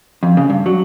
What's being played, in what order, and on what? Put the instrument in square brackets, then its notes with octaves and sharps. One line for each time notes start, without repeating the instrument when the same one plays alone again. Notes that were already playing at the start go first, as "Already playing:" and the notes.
[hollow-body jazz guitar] F2
C#3
G2
F#3